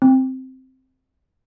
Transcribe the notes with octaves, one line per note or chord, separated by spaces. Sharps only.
C4